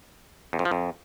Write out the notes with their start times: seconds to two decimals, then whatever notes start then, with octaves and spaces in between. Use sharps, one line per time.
0.53 E2
0.59 F2
0.65 F3
0.71 F2